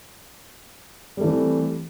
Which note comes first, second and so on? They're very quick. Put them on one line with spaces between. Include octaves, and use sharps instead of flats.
G3 A3 E3 C4